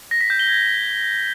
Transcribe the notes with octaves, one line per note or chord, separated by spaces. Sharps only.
A#6
B6
G6
G7
G#6